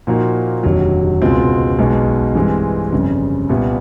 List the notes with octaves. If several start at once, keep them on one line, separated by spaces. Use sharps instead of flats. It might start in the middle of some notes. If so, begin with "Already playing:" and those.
A#2 F3 A#3 D#4 F#4
F1 D#2 D3 F#3
C#2 B2 G#3 C4 F4
B1 B2 G#3
G2 E3 G#3 C4
G1 F2 C#3
C2 A#2 G3 B3